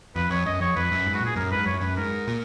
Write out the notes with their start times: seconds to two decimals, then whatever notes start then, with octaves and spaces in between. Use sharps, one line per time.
0.16 F2 B4
0.30 F2 C#5
0.46 F#2 D#5
0.60 F2 C#5
0.76 F2 B4
0.91 F#2
1.07 G#2
1.14 F#4
1.21 A#2 G#4
1.36 F#2 A#4
1.51 G#2 B4
1.66 F#2 C#5
1.81 F#2 B4
1.96 G#2 A#4
2.28 A#2